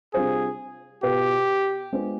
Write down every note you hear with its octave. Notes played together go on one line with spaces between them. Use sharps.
C3 G3 D4 F4 G#4 C5
B2 B3 F4 G4 B4
G#3 B3 D4 F4 C5